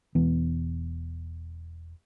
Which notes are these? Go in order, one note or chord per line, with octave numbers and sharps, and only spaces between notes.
E1 E3 B3